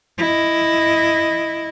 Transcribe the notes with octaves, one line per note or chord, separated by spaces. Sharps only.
E4 D#5